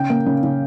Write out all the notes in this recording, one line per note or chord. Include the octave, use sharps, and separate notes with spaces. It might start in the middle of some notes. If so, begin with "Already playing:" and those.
Already playing: C#3 G5
A#3
C#3
C#3